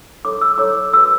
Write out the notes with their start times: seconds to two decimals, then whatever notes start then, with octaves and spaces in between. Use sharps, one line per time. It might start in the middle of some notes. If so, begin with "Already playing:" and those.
0.25 E4 A4 C#5 D6
0.41 E6
0.58 E4 A4 C#5 D6
0.93 F#4 B4 E6